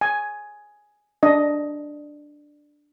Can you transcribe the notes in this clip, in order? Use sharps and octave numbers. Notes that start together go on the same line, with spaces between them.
G#5
D4 D#5